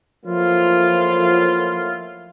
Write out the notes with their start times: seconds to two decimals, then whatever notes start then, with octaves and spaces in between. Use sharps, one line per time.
0.25 F3 F#3 A3 A#3 E4 F4